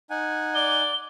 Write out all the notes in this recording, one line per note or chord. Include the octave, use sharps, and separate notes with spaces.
D#4 F#5 G#5
D5 G7